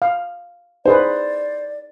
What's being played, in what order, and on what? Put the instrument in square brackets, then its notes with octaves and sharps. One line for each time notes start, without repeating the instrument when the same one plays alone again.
[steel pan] F5
[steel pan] D#4 G#4 B4 [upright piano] C5 [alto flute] D5